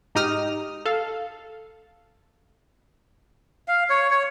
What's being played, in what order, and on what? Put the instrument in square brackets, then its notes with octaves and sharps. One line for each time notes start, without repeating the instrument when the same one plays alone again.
[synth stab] G#2 D#4 G4 D#6 F6
A4 F5
[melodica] F5
C#5
C#5